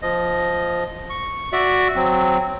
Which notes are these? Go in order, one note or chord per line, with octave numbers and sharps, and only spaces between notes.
F3 D#5
C#6
F#4 D5 E5
F#3 C4